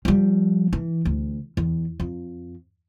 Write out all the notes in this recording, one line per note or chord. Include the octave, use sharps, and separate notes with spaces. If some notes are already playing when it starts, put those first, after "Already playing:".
F3 G3
E3
D2
E2
F2